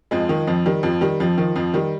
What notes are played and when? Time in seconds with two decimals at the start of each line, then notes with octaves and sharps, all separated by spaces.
0.11 F2 F3 G#3
0.29 D#3
0.47 F2 F3
0.66 D#3 G3
0.83 F2 F3
1.01 D#3 G3
1.20 F2 F3
1.38 D#3 F3
1.56 F2 F3
1.74 D#3 G3